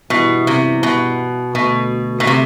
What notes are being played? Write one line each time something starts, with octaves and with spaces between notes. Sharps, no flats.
G2 B2 E3 G3 B3 E4
C3
B2
D2 B2 D3 A3
B2
C3